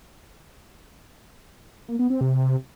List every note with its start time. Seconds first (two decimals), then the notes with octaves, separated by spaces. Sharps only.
1.88 A#3
1.99 B3
2.10 C4
2.21 C3